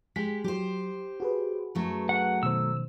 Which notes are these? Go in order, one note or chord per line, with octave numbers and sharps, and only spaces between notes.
G#3 G4 B6
F#3 G4 C5
F#4 G#4 B4
F#2 F#3 A3
F#5
B2 D#3 C5 E6